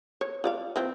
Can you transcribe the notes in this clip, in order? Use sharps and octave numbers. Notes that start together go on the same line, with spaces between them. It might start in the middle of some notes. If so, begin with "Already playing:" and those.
C#5
F4 D5 F5
E3 F3 C4